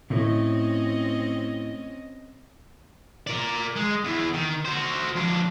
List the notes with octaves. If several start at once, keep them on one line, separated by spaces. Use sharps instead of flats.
A2 C4 C#4 D#5
A#4 D5
G#3
E2 E3
D#3
F#4 C5
F2 D4